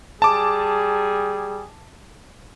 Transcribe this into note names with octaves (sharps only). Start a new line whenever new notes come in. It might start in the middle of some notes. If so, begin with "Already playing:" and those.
G3 G#4 A5 D6